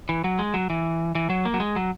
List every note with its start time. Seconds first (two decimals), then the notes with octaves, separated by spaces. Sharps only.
0.09 E3
0.24 F#3
0.39 G#3
0.54 F#3
0.70 E3
1.15 E3
1.30 F#3
1.45 A#3
1.54 F#3
1.60 G#3
1.76 F#3